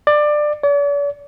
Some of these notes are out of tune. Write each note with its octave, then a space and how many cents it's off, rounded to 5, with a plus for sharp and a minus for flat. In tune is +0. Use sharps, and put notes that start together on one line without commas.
D5 +20
D5 -45